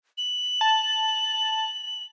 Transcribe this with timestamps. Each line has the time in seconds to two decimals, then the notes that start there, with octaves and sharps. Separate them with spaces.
0.18 F#7
0.61 A5